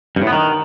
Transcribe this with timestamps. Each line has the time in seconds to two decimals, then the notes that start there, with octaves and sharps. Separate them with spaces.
0.16 G2
0.22 A2
0.27 B3
0.32 D#3